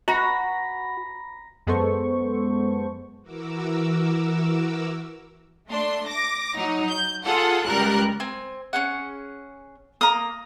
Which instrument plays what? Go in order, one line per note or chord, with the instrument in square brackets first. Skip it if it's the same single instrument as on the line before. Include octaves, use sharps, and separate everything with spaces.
[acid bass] F#4 [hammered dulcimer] A#5 B5
[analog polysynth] F#2 G#3 B3 A4 C5 C#6
[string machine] E3 F#4 A#4 D6 E6
[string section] A3 D4 C6
D6 A#6
F#3 D#4
G6
F4 G#4 A4 F#5
C#2 G3 A#4 F#6
[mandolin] C4 G#5
C#4 G#4 F#5
[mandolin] A#3 [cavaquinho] A#5 D#6